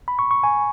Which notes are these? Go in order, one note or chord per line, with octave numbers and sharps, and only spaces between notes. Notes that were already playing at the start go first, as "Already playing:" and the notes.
B5
C#6
C#6
G#5